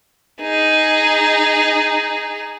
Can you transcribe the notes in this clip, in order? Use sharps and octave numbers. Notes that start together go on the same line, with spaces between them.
D#4 G#4